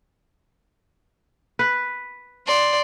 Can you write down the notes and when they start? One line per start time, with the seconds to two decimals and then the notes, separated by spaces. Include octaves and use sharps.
1.59 B4
2.46 D5 C6